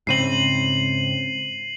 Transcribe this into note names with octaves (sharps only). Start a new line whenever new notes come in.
G#2 C#3 C4 C7 D#7 F#7